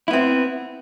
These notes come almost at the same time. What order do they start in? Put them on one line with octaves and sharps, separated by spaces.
E4 B3 C4